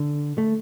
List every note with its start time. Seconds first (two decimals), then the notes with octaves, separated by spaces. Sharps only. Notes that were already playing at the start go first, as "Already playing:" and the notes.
Already playing: D3
0.38 A3